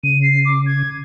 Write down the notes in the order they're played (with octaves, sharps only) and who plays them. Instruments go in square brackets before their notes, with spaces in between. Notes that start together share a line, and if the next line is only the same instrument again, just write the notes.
[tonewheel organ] C#3 [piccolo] D#7
[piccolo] C7
D6
G#6